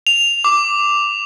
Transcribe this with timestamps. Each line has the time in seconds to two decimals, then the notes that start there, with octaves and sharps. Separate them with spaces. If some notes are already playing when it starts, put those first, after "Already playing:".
0.07 F7
0.44 D6